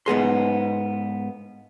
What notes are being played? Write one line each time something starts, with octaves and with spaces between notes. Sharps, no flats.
G#2 B3 G#4 C6